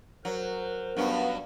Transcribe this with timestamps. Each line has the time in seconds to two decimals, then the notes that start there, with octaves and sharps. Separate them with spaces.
0.25 F#3 A#4 C5
0.97 G2 F#3 B3 C#4